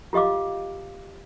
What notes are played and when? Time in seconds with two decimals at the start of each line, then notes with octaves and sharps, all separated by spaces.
0.13 F4 G4 D#5 F5 D6